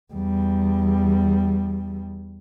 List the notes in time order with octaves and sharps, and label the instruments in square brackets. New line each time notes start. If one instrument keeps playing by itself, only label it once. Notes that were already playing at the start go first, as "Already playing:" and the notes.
[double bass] E2 G3